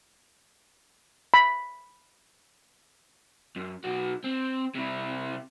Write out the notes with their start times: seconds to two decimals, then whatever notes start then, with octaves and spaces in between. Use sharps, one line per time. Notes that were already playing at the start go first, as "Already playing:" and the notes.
1.34 B5
3.56 F#2
3.84 B1 F#4
4.24 C4
4.75 C3 E4